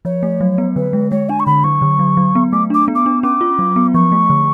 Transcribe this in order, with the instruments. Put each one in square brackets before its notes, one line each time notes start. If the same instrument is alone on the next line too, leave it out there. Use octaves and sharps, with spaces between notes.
[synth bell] F3 [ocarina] C#5
[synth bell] A3
F#3
B3
[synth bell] D3 [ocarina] B4
[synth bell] G#3
[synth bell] G#3 [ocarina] C#5
[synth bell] D4 [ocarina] G#5
[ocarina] C#6
[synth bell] D3 [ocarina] B5
[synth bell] F#3 [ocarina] C#6
[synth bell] D3
F#3
F#3
B3
[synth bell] A3 [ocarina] D6
[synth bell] D4 [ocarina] D6
[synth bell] B3
[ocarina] D6
[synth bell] D4
[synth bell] C#4 [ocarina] D6
[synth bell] F4
F#3
B3
[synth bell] F3 [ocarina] C#6
[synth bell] A3
D3